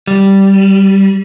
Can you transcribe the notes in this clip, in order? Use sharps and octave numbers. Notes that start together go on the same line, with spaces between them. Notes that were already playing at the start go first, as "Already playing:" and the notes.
G3